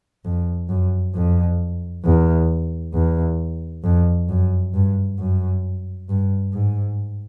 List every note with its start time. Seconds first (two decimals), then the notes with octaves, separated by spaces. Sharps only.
0.25 F2
0.69 F#2
1.15 F2
2.05 E2
2.94 E2
3.84 F2
4.29 F#2
4.74 G2
5.19 F#2
6.09 G2
6.54 G#2